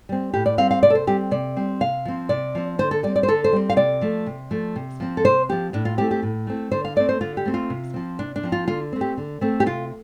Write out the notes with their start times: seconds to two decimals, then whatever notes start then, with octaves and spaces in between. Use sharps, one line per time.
0.09 G3 C4
0.34 A2 G4
0.46 D5
0.58 G3 C4 F5
0.71 F5
0.83 C3 D5
0.90 A4
0.95 C5
1.07 G3 C4 G4
1.31 C3 D5
1.57 G3 C4
1.81 C3 F5
2.05 F3 C4
2.29 C3 D5
2.55 F3 C4
2.79 D3 C5
2.91 A4
3.03 G3 D5
3.07 C4
3.16 D5
3.23 C5
3.28 D3 A4
3.44 C5
3.53 G3 C4
3.70 F5
3.77 C3 D5
4.01 F3 A3
4.26 C3
4.51 F3 A3
4.76 C3
5.00 F3 C4
5.17 A4
5.25 C3 C5
5.49 F3 C4 G4
5.73 A2 D4
5.85 F4
5.98 A3 C4 G4
6.11 G4
6.23 A2
6.47 A3 C4
6.72 D3 C5
6.85 F5
6.96 A3 C4 D5
7.09 C5
7.21 D3 F4
7.37 G4
7.45 A3 C4
7.54 F4
7.70 C3
7.94 F3 C4
8.19 C3 D4
8.36 D4
8.43 F3 C4
8.52 F4
8.68 D3 F4
8.93 A3 C4
9.01 G4
9.18 D3
9.41 A3 C4
9.60 G4
9.66 C3 F4